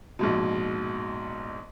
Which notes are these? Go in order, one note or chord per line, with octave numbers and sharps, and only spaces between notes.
A#1 G#2 B2